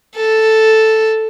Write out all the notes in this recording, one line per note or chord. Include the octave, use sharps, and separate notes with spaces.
A4